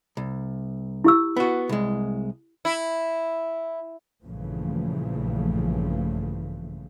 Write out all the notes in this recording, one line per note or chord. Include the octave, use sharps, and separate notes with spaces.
C2
E4 G4 E6
B3 F#4
C2 G#3
E4
A#1 G2 C#3 E3 F3 A3